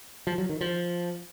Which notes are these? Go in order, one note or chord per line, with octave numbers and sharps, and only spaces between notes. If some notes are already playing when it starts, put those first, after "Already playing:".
F3
F#3
D#3
F3